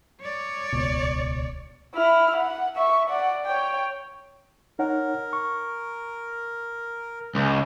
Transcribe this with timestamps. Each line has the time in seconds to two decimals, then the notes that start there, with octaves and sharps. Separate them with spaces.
0.23 C#5 D5
0.72 D#1 C#2 B2
1.95 E4 F6
2.37 F#5
2.76 E5 C#6
3.10 D5 F#5
3.46 C#5 G5
4.79 D#4 A#4 C#5 F#5
5.33 C#6
7.35 C#2